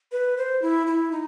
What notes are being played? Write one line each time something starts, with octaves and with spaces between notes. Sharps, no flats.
B4
C5
E4
E4
D#4